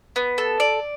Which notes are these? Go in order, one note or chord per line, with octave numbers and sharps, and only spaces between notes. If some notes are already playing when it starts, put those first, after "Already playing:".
B3
A4
D5